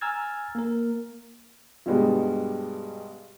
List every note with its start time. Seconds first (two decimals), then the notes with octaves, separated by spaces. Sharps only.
0.01 G#5 A#5 E6 F6 G#6 A6
0.55 A#3 A#4
1.86 G2 B2 G3 G#3 B3